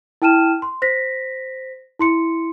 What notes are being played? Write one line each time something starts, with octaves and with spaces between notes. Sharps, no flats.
E4 G5 A5 F6 D#7 E7
C6
C5 A#6 B6
E4 C6 C#7